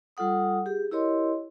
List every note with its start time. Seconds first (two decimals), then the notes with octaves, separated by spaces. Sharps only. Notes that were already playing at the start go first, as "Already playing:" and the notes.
0.17 G3 F4 A4 F#5 D#6
0.66 G4 G#4
0.91 E4 G4 A#4 C#5 D#5 C6